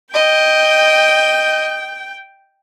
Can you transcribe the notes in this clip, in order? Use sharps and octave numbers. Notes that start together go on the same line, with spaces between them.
D#5 G5 G6